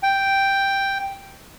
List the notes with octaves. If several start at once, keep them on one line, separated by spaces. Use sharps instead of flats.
G5